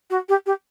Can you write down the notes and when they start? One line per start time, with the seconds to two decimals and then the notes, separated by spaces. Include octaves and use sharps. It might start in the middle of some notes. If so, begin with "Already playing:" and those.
0.10 F#4
0.29 G4
0.46 G4